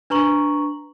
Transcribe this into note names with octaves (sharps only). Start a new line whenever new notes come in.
D4 B4 A#5 C#6 F#7